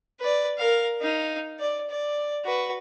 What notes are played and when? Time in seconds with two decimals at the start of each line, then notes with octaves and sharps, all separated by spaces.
0.20 B4 D5
0.58 A#4 F5
1.01 D#4 F5
1.59 D5
1.90 D5
2.44 F#4 B4